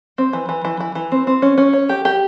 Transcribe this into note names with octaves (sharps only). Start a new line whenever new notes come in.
C4
E3
E3
E3
E3
E3
C4
C4
C#4
C#4
C#5
G4
G4